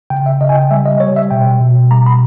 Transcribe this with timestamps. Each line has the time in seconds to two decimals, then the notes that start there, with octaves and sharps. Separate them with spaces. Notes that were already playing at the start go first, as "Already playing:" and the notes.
0.10 C#3 G5
0.26 E5
0.41 C#3 D#5
0.49 G#5
0.55 G5
0.71 G3 E5
0.86 D#5
1.00 G3 C#5
1.16 E5
1.31 B2 G5
1.60 B2
1.91 G3 A#5
2.06 B5